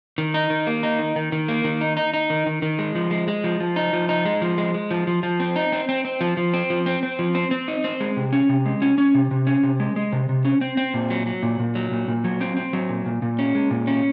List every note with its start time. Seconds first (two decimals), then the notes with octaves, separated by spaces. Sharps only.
0.18 D#3
0.34 D#4
0.50 D#3
0.67 A#3
0.83 D#4
0.99 D#3
1.16 D#3
1.32 D#3
1.48 A#3
1.64 D#3
1.81 D#4
1.97 D#4
2.14 D#4
2.30 D#3
2.46 D#3
2.62 D#3
2.79 G#3
2.95 F3
3.11 G#3
3.28 G#3
3.44 F3
3.60 F3
3.76 D#4
3.93 F3
4.09 D#4
4.25 G#3
4.42 F3
4.58 G#3
4.74 G#3
4.91 F3
5.07 F3
5.23 F3
5.40 C4
5.56 D#4
5.72 C4
5.89 C4
6.05 C4
6.21 F3
6.37 F3
6.54 C4
6.70 F3
6.86 C4
7.03 C4
7.19 F3
7.35 C4
7.51 C4
7.68 D#4
7.84 C4
8.00 G#3
8.17 C3
8.33 C#4
8.49 C3
8.66 G#3
8.82 C#4
8.98 C#4
9.15 C3
9.31 C3
9.47 C#4
9.63 C3
9.80 G#3
9.96 G#3
10.13 C3
10.29 C3
10.45 C#4
10.61 C4
10.77 C4
10.94 A#2
11.10 F#3
11.26 F#3
11.43 A#2
11.59 A#2
11.75 F#3
11.91 A#2
12.08 A#2
12.24 F#3
12.41 C4
12.57 C4
12.73 F#3
12.89 A#2
13.06 A#2
13.22 A#2
13.39 C#4
13.55 G#3
13.71 A#2
13.87 C#4